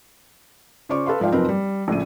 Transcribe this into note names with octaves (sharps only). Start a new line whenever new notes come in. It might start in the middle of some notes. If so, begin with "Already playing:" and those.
C#3 F4 C5 D5 C#6 D6
A4 B4 F5 C6
G#2 F3 D5 F5 G5
F#1 F3 C4 D#4 A#4 B4
G3
A#1 A2 C#3 D#7